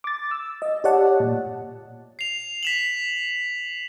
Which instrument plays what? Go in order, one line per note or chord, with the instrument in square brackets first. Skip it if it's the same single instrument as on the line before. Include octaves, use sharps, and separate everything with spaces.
[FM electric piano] D6 A6
E6
D#5
G4 C#5 D5 F#5 A5
A#2
[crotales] C7 F7
B6 E7 F#7